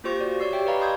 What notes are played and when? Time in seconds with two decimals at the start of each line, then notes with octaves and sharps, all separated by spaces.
0.04 A#3 F4 G4 C5 C#6 A#6
0.20 F#4 D5
0.40 C#5 D5 C#6 E6 C7
0.52 G4 E5 G5
0.66 B4 D5 D#5 F5 A#5 B5
0.80 D#5 C6 C#6 D#6 G6 G#6